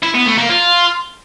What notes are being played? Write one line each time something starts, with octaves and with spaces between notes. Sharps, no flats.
E4
B3
A3
A#3
F4